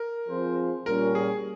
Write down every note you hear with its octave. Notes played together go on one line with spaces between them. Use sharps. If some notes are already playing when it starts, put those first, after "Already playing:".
Already playing: A#4
F3 C4 F4 G#4 C5
A#2 G3 C#4 A#4
G#4